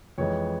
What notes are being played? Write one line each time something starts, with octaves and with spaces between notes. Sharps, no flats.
F2 E3 G#3 C#5